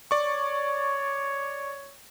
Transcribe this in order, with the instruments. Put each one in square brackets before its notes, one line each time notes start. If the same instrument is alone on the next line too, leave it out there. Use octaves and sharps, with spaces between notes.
[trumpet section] C#5 [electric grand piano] D5 C#6